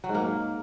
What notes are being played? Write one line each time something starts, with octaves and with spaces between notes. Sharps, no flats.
F#3
G#2
A#3